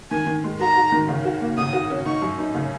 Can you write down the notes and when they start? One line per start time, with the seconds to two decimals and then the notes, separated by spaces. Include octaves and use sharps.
0.11 D#3 G#5
0.27 D#3
0.44 G#3
0.60 F#4 A#5
0.76 F#4
0.92 D#3
1.08 C#3
1.24 F#4
1.41 A#3
1.57 C#3 D#6
1.73 F#4
1.90 C#4
2.05 D#4 C#6
2.22 F#2
2.38 D#4
2.55 C#3